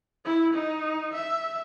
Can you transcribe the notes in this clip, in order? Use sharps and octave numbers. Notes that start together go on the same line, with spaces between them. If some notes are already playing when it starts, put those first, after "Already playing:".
E4
D#4
E5